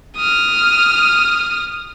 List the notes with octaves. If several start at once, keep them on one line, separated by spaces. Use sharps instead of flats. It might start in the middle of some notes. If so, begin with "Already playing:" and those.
D#6 F6